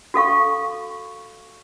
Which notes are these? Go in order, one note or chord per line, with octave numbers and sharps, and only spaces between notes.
F#4 A4 F5 C#6